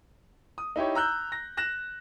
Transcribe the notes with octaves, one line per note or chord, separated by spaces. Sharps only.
D#6
D#4 E4 G4 C#5
A#5 E6 F#6 G6
A#6
F#6 A#6 E7